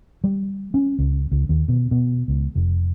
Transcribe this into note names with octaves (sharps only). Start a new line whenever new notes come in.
G3
C#4
C#2
C#2
D#2
B2
B2
C#2
F1